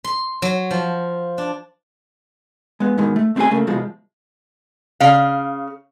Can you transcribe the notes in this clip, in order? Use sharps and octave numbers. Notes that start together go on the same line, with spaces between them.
C6
F#3
F3
D4
G#3 B3
G#2 B2 D#3 G#3
A3
A3 C4 D4 E4 G#4 G#5
C#3 A3 A#3
C2 B2 F3 G#3
C#3 F5